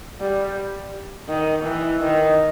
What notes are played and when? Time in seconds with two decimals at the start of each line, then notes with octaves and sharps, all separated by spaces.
0.21 G3
1.29 D#3
1.65 E3
2.01 D#3